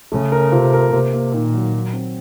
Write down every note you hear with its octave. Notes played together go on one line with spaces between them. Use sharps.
C#3 A3
A#4
C3 F4
A#4
C3 A#3
A#3
A#2 D#3
F#3
F#3
C4